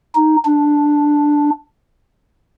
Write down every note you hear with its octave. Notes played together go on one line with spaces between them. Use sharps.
D#4
D4